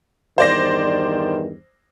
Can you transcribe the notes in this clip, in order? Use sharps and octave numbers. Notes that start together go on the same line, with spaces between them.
E2 G2 D#3 C5 D5 A#6